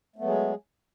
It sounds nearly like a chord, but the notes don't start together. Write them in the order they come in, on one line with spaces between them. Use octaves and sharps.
A3 B3 F#3 G#3 G#4